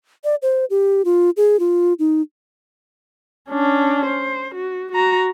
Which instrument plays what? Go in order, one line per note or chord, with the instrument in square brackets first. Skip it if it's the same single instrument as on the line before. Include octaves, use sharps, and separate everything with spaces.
[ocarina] D5
C5
G4
F4
G#4
F4
D#4
[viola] C#4 D4
C5
F#4
F#4 A#5